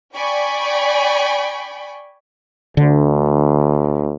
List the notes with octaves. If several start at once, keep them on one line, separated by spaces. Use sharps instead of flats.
D5 G5 G#5 B5 C#6
D2 D3